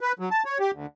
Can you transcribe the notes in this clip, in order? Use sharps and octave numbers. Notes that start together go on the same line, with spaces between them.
B4
F#3
A5
C#5
G4
D2